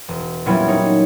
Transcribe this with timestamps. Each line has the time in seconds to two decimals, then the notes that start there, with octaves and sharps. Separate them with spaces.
0.08 E1
0.46 A#2 F#3 G3 B3 C#4 E4
0.68 D#4 C#5